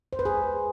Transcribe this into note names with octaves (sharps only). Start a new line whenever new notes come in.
C5
B4
G#4